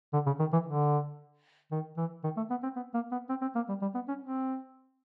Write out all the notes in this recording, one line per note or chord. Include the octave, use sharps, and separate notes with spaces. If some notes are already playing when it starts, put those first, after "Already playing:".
D3
C#3
D#3
E3
D3
D#3
E3
D#3
A3
B3
C4
B3
A#3
B3
C4
C4
A#3
G3
G3
B3
C#4
C4